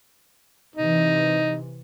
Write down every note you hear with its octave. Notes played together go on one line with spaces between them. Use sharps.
C3 E3 D#4